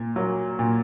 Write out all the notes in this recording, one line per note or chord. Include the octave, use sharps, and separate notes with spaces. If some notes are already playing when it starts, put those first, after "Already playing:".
Already playing: A#2
F#3 A#3
A#2